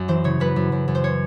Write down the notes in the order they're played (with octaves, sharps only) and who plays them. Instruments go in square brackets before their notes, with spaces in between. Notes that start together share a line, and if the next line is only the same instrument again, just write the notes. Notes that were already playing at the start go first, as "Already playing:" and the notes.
Already playing: [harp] F#2
E3 C5
C#3 C#5
F#2 B4
F#2
F#2
F#2
C5
C#5